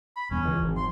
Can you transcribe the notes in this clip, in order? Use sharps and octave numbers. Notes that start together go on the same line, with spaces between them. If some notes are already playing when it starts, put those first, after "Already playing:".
B5
E2 G2 B2 C#4
C#2 E3
G#1
F3 C6